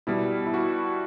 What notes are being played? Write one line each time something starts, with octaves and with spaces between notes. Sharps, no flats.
B2 G3 E4
E4
F#4